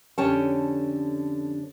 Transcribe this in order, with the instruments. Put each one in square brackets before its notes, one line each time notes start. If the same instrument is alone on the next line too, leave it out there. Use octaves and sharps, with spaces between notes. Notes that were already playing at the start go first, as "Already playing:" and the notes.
[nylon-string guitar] F2 D3 C#4 G4 C#5 A5